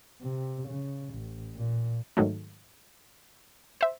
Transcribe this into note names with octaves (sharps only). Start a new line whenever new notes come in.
C3
C#3
A1
A#2
G#2 D#3 F#3 A3
C5 E5